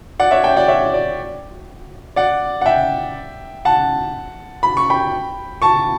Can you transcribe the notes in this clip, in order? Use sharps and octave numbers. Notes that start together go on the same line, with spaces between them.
D5 F#5
C#5 E5
E5 G5
D5 F#5
C#5 E5
D5
D5 F#5
F#5
E5 G5
F#5 A5
B5
C#6
G5 B5
A5 C#6